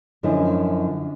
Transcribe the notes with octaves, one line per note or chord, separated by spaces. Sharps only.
F#2 D3 F3 E4 D#5 G#5